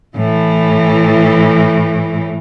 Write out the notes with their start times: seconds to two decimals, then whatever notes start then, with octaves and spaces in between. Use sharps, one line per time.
0.16 A2 E3